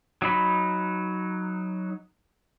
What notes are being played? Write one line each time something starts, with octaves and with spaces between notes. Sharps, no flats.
F#3 D#4 B5